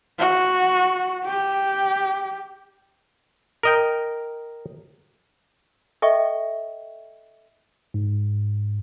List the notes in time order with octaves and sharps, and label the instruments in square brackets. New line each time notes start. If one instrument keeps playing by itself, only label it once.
[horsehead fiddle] F#4
G4
[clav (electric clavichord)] A#4 D#5 G5
[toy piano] A4 D#5 E5 G5 C#6
[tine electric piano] G#2